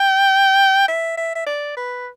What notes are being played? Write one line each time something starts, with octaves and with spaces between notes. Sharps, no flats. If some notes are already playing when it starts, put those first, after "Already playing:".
Already playing: G5
E5
E5
E5
D5
B4